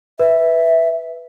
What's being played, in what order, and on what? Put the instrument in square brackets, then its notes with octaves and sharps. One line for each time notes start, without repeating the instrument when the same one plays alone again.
[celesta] B4 [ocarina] E5